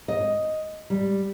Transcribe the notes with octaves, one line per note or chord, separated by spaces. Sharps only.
D#5
G3